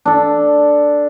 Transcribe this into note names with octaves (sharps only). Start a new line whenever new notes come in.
D4 A4